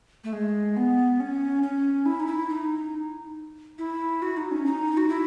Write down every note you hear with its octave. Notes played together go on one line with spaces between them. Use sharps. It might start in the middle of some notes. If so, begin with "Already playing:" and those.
A3
G#3
B3
C#4
C#4
E4
D#4
E4
D#4
E4
F#4
D#4
C#4
D#4
F#4
E4